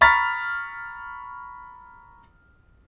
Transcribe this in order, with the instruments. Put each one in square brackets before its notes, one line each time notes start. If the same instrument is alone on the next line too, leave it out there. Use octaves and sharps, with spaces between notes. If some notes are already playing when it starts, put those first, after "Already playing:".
[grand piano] A#5 B5 C#6 F6 A6 B6